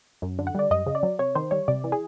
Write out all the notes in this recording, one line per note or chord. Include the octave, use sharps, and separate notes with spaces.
F#2
D3
F#5
G3 D5
F#2 D#5
C#3
D5
F#3
C3 C#5
D#3 C5
G3 C#5
C3 D5
E3
G#4